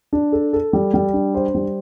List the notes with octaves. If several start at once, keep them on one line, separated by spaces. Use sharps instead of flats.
D4
A4
A4
G3
G3
D4
C5
G3